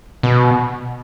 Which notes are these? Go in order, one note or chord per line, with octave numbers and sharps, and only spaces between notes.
B2